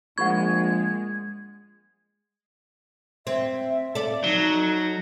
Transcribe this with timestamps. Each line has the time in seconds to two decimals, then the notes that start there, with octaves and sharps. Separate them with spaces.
0.18 A#1 G#3 F#5 B5 C#6 G#6
3.27 C4 E5
3.95 A4 D5
4.24 F#3 D#4